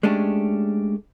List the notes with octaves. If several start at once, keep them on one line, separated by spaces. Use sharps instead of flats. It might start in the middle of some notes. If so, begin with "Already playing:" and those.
G#3 A3 C#4 D4 G4